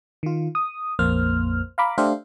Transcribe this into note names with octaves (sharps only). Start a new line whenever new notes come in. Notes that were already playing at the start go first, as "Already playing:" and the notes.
D#3 F4
D#6
A#1 F2 A#3 C5 F6
F5 A#5 B5 D6
A3 D4 G4 C5 E5 F5